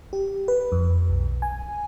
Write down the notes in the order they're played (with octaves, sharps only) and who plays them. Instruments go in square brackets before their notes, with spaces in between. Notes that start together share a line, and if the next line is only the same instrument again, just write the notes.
[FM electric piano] G4
B4
F2
B1
G#5